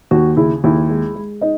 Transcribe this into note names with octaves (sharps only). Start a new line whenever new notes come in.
D#2 F#4
C#3 E4
D#2 E4
G#3
G#3
D#4 D#5